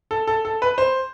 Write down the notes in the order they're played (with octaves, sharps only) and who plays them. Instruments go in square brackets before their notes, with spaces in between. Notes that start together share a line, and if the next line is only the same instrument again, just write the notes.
[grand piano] A4
A4
A4
B4
C5